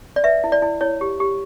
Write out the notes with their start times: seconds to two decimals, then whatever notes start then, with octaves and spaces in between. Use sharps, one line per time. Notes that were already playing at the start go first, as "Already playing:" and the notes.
0.16 D5
0.24 B4 E5
0.44 E4
0.52 D5
0.62 E4
0.81 E4 C#5
1.01 G4
1.20 G4